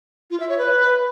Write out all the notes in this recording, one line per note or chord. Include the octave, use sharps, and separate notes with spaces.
F4
E5
C#5
B4